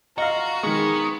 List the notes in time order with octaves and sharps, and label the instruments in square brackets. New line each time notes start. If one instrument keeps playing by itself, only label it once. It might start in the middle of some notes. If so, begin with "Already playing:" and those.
[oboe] F4 [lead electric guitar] F#4 [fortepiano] D#5 F5 [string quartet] A#5
[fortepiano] D#3 G#3 [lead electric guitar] B3 [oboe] C#6